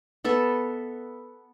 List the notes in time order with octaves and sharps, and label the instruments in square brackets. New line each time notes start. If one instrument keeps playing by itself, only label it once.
[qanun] B3 A4 E5